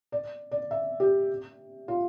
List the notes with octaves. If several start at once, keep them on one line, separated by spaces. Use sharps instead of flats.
D5
D5
E5
G4
F4